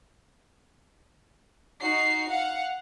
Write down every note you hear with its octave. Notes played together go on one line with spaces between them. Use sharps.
D#4 F#4 C7
F5 F#5